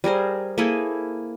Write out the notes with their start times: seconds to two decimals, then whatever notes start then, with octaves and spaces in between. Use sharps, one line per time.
0.04 G3 G#4 A#4 C5
0.58 A#3 E4 G#4 A4